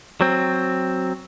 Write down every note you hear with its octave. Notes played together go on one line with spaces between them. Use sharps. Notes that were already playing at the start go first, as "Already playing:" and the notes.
F#3 C4